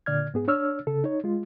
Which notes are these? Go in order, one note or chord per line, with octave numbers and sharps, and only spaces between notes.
A#2 D3 D5 F6 G#6
G#2 B3 G#4
D4 C#5 E6 F6
C#3 A4
D#4 C#5
G#3 F4